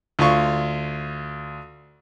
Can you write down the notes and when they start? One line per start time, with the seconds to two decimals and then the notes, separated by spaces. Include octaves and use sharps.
0.19 D2 F4 F5 C#6